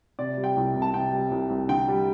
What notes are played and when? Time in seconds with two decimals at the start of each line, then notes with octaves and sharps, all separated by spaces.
0.19 C3 D5
0.37 G3
0.44 G5
0.57 C2
0.75 C2
0.82 A5
0.94 C3 G5
1.13 G3
1.32 C2
1.50 C2
1.69 D3 G5
1.88 G3